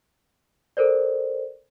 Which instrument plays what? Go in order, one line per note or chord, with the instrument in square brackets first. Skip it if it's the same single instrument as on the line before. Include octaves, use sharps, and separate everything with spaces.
[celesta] A4 A#4 C5 D5